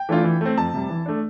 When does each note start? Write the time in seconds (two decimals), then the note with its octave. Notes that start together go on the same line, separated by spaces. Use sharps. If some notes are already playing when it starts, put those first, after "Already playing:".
Already playing: G5
0.09 E3 A3 D4 F4
0.24 E3
0.41 A3 C4
0.57 F2 A5
0.74 C3 G3
0.90 E3
1.06 A3 D4